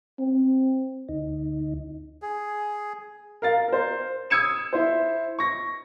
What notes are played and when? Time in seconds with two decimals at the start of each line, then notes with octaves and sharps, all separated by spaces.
0.19 C4
1.09 D2 D#4
2.22 G#4
3.42 A#4 F5 A6
3.68 A#4 C5
4.30 D#6 E6 G#6 C#7 E7
4.73 E4 C5
5.39 C#6 A#6